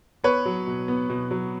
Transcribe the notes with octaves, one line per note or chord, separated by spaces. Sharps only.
B3 B4 C#5
F#3
B2
B3
B2
F#3